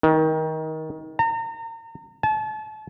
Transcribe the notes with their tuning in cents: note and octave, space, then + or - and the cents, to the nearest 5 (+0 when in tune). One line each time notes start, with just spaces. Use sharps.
D#3 +20
A#5 -35
A5 -35